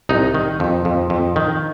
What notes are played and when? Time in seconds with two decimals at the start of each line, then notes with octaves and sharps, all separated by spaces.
0.09 C2 D#4
0.35 D#3
0.60 F2
0.85 F2
1.10 F2
1.36 D#3